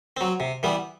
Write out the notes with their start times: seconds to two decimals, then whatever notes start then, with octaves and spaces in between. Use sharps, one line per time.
0.17 F#3 C4
0.40 C3
0.63 E3 G3 B3